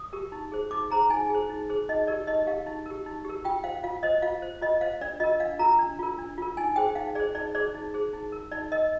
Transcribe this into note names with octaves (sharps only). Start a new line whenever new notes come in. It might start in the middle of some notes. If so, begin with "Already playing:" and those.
Already playing: D#6
G4 A#4
D#4
G#4 C5
D#4 D6
G#4 C5 A#5
D#4 G#5
G#4
C5
D#4
G#4 C5
D#4 D#5
G4 A#4 D5
D#4 D#5
G4 A#4 F5
D#4
G4 A#4
D#4
G4 A#4
F4 G5
C5 F5
F4 F5
C5 D#5
F4 F5
C5
F4 D#5
C5 F5
D4 D5
F4 A#4 D#5
D4 F5
F4 A#4 A#5
D4
F4 A#4
D4
F4 A#4
D#4 G#5
G#4 C5 G5
D#4 F5
G#4 C5 D5
D#4 D5
G#4 C5 D5
D#4
G#4 C5
D#4
A#4
D#4 D5
A#4 D#5